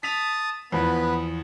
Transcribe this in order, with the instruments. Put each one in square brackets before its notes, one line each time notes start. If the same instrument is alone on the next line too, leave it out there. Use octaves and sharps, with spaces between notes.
[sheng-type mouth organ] A5 D#6 [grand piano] B6 F7
[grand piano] E2 F3 [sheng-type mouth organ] B3 B4